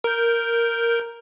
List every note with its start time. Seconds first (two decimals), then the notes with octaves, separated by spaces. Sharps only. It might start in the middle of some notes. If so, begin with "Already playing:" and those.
0.04 A#4 G6